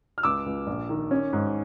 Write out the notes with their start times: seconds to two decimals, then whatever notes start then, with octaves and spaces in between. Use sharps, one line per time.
0.18 F6
0.23 C#2 D6 E6
0.46 C#2
0.67 A#1
0.89 D#3
1.11 C#4
1.33 G#2